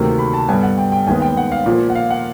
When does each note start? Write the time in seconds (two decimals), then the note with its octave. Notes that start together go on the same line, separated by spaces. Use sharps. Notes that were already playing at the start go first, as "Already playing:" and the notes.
Already playing: D2 C3 D#3 F#3 A#3
0.19 B5
0.34 A5
0.48 G2 D3 G3 B3 G#5
0.63 F#5
0.78 G5
0.92 G5
1.07 D#2 D#3 G#3 B3 G#5
1.22 G5
1.37 F#5
1.52 F5
1.66 A#2 F3 A#3
1.90 F#5
1.95 F5
2.10 F#5